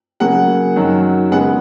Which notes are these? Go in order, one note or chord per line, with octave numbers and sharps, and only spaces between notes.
C#3 F#3 A#3 F#5
F#2 D#3 F#3
C#3 G#3 B3 F#5